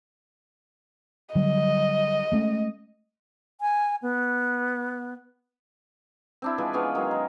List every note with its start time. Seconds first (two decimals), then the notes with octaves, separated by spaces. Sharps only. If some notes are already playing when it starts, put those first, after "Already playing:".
1.35 D3 F#3 G3 D#5
2.32 G#3 A3 C#4
3.61 G#5
4.02 B3
6.42 C4 D4 E4
6.58 E3 F3 G#3 B4
6.73 B3 C#4 G#4
6.95 D#3 F#3 G#3
7.11 A#4